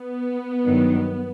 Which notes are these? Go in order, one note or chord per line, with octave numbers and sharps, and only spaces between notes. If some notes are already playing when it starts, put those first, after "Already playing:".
Already playing: B3
G2 D#3 F#3